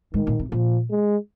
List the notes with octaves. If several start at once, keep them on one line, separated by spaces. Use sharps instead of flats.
G#2 D#3
A#2
C3
A#2 F3
G#3